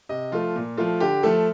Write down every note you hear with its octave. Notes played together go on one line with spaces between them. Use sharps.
C3 D#5
F3 A3 F4
A#2
F3 A3 F4
D3 G4
F3 A3 A4